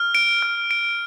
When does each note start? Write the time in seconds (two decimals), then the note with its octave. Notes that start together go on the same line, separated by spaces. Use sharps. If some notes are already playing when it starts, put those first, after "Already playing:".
Already playing: F6
0.15 D7
0.43 F6
0.71 D7